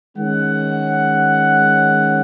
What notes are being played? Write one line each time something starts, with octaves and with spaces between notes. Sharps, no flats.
D#3 G#3 C#4 F#5